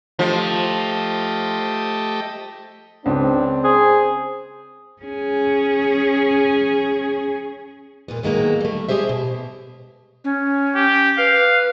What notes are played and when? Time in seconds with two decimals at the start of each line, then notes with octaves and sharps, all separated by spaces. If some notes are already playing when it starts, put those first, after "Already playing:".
0.19 F3 A3 G4 D#5
3.06 C#2 C4 D4
3.64 G#4 C5
5.02 C#4 G#4
8.08 A#2 A#3 B3
8.23 D#3 F#3 G#3 A#3 B3
8.61 G3 A3
8.89 G#3 G4 G#4 C5 E5
9.09 B2
10.24 C#4
10.75 G4
11.18 B4 F5